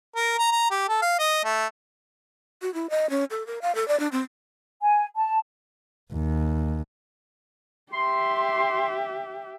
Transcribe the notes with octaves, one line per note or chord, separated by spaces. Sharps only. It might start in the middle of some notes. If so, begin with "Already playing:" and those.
A#4
A#5
A#5
G4
A4
F5
D#5
A3
F#4
E4
D#5
C#4
A4
A#4
F5
A4
D5
D4
C4
G#5
A5
D#2
G4 E5 C6